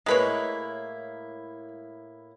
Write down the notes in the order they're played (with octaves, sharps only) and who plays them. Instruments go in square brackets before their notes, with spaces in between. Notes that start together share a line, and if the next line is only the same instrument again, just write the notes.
[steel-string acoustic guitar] A2 A#3 E4 [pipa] G#3 B4 C#5